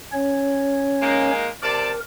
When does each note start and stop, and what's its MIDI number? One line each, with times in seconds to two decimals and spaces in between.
0.12 1.31 61
0.12 1.31 73
1.02 1.48 56
1.02 1.48 58
1.02 1.48 63
1.63 1.91 48
1.63 2.00 70
1.63 1.91 74
1.63 1.91 81